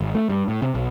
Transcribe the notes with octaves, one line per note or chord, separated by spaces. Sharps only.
G#1
A3
G2
A2
C3
B1